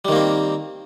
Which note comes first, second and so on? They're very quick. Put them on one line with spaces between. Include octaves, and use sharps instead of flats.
G3 D#3 A#3 C4